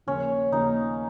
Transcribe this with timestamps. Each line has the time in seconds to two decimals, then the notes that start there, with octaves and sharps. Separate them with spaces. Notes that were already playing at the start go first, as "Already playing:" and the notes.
0.07 D#2 C#3 F3 A#3 C#4
0.52 D#2 C#3 F3 A#3 D#4